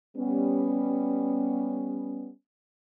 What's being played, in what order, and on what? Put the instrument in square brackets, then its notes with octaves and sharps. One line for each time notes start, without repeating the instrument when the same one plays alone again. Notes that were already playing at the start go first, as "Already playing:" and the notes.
[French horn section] G3 B3 C#4